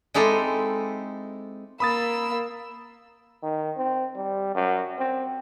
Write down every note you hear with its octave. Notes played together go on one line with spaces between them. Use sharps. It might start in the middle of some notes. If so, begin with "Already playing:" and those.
G#3 C4 D#4 E4 G4 A4
A#3 B5 D#6 E6 A6
D#3
C4
G3
F#2
C4